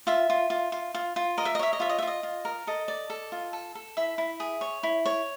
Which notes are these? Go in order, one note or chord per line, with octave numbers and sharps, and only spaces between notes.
F4 E5
F4
F4
F4
F4
F4
A#4 D#5
E5
D#5
C#5 E5
D#5
F4 E5
D#5
E5
F4 D#5
F4
A#4
A4 D#5
D5
A4
F4
A4
A4
E4 E5
E4
G#4
C#5
E4
C#5